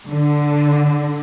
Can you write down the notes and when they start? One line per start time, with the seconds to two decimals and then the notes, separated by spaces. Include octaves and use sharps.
0.11 D3